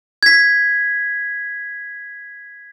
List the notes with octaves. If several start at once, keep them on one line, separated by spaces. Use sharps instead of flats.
G#6 B6